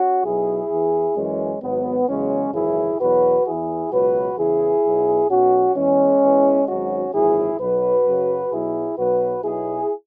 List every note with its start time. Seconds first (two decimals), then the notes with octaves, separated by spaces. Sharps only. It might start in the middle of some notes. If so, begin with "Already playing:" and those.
Already playing: C#4 F#4
0.23 B1 B2 F#3 E4 G#4
0.70 E2 E3
1.15 F#2 E3 G#3 C#4
1.62 G#1 G#2 F#3 B3
2.07 E2 C#3 F#3 G#3 C#4
2.54 G#1 F#2 C#3 E3 E4 G#4
2.99 E2 B2 F#3 F#4 B4
3.46 E2 E3 E4 G#4
3.91 C#2 B2 F#3 F#4 B4
4.37 E2 C#3 E3 E4 G#4
4.84 B1 B2 F#3
5.29 B1 B2 F#3 C#4 F#4
5.75 E2 E3 G#3 C#4
6.22 E2 E3
6.67 G#1 G#2 F#3 C#4 F#4
7.13 G#1 F#2 E3 E4 G#4
7.59 B1 B2 F#3 F#4 B4
8.05 F#2 C#3 F#3
8.50 B1 B2 F#3 E4 G#4
8.97 B1 B2 F#3 F#4 B4
9.43 B1 B2 F#3 E4 G#4